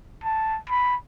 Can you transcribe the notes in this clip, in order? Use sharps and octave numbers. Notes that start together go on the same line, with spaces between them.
A5
B5